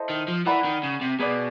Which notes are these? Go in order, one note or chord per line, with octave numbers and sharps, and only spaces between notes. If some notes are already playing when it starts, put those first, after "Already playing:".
Already playing: E4 A4 C5 D#5
D#3
F3
E3 A#4 D5 F#5 B5
D#3
C#3
C3
B2 G#4 B4 D5